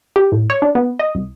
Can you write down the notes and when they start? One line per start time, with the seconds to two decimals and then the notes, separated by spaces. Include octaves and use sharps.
0.16 G4
0.32 A2
0.50 C#5
0.62 D4
0.75 B3
0.99 D#5
1.15 C2